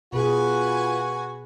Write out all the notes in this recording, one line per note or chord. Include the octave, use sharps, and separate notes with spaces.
B2 F4 F#4 G#4 B4 G#5